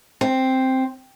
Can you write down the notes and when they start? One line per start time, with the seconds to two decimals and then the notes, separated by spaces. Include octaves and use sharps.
0.21 C4